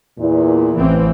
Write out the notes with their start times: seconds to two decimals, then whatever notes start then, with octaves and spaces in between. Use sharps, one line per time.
0.19 E2 A#2 E4
0.78 A1 E3 C4